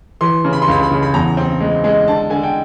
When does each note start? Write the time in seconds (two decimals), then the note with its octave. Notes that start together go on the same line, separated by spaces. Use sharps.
0.21 E3 C6
0.44 C#3
0.53 B5
0.62 C6
0.68 C#2 B5
0.83 B5
0.91 C#3
1.03 B5
1.14 E2 A#5
1.37 C4
1.60 G#3
1.84 G#3
2.07 D3 A5
2.30 D3 G#5
2.43 G5